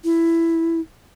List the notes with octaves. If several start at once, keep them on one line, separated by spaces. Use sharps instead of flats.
E4